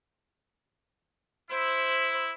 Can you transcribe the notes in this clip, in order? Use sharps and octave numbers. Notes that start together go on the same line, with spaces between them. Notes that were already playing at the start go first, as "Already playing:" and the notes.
E4 C5